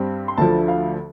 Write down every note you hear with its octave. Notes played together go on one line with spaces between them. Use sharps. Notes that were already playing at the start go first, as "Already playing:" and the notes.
Already playing: G2 G3 C4
C6
D2 D3 F3 A5
F5